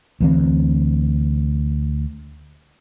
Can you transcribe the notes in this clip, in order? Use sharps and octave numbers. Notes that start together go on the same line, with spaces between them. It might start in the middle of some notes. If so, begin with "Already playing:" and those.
D2 E3 C4